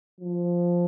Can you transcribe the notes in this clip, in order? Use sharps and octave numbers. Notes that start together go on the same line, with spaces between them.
F3